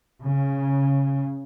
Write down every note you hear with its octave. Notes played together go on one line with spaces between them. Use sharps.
C#3